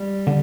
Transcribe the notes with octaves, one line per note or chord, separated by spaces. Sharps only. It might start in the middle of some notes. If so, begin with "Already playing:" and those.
Already playing: G3
D3